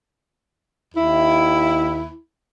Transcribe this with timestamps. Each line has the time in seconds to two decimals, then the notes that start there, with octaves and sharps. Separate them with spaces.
0.95 D#2 E4